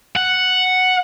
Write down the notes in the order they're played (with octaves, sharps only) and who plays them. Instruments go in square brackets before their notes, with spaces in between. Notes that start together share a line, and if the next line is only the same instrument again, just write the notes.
[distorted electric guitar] F#5